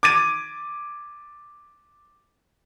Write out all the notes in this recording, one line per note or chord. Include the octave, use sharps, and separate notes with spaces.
D6 G#6 A6 D#7